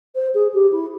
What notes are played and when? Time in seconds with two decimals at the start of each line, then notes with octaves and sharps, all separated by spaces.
0.15 C5
0.34 G#4
0.53 G4
0.71 E4